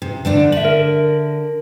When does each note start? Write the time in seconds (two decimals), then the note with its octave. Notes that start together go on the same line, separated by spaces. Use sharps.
0.02 C3
0.25 D3 A3 D4
0.52 D3 E5 F#7
0.64 A#4